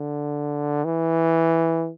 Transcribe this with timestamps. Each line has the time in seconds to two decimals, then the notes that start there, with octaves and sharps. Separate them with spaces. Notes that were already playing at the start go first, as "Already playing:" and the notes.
Already playing: D3
0.85 E3